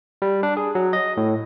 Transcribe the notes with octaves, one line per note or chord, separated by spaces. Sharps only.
G3
D4
G#4
F#3
D#5
A2